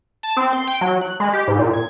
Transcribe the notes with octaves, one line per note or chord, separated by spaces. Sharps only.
A5
C4
C6
G5
F#3
F#6
G#3
G4
G#2
A#2
G#6